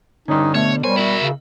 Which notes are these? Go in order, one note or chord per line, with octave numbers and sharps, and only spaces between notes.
G2 D3 C#4 D#4
B2 A3 C#5
G3 A#4 C5 C#5 G#5
E4 F#4 A#4 E5
C#3